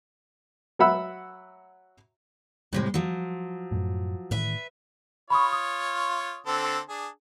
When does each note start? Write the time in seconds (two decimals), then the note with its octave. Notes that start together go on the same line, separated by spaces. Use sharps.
0.79 F#3 E5 F#5 B5 E6
2.73 A2 C3 G3 G#3
2.94 F3 F#3
3.72 F#2 A2
4.31 A2 D#3 E3 B4 E5
5.30 F4 C#5 B5 C#6 D#6
5.53 D#6
6.47 D3 C4 A4
6.89 D4 G#4